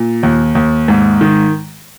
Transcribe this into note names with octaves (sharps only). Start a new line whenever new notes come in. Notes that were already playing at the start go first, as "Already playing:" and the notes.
Already playing: A#2
D#2
D#2
G#2
D#3